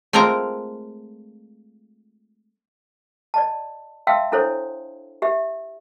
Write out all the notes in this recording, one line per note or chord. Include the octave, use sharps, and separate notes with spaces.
G#3 A3 C4 F4 A#4 A#5
D5 D#5 A5
E5 F5 G5 A5 C6 E6
D4 E4 A4 C5 C#5
G4 E5